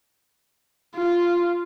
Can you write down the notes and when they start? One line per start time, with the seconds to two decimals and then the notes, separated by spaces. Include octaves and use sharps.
0.96 F4